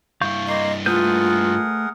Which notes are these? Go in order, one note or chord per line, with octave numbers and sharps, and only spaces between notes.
G2 E4 F5 C#6 G6
A#3 D#5 C6
A3 F4 G#4 A#4 B4 F#5 G6